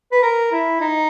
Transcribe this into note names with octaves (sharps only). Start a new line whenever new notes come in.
B4
A#4
E4
D#4